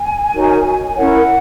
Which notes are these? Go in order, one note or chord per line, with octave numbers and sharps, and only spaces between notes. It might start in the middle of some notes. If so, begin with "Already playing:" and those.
Already playing: G#5
D#4 F#4 A#4 C#5
C#4 E4 A#4 C#5 F#5